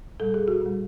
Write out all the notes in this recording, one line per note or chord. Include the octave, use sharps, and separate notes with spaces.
A#2 G3 A4
G#4
F#4
A#2 G3